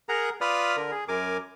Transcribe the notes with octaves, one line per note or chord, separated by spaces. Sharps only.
G#4 A#4 F#5 A#5
F4 B4 D5 B5 D#6 F6
D3 A#4
G#4
F#2 A#4 G#5 D6